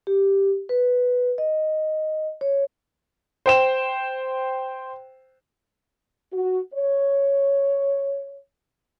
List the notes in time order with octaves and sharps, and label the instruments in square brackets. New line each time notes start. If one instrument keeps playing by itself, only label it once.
[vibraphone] G4
B4
D#5
C#5
[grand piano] C5 G5 E7
[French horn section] F#4
C#5